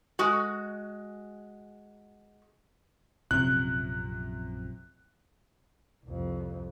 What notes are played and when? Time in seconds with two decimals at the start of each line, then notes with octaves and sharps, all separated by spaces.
0.19 G#3 F#4
3.31 A#1 F#2 C3 F3 F#6
6.05 C2 F2